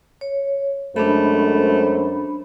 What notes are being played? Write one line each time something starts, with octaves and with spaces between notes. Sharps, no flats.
C#5
F#2 G#3 A3 D4 C5 B5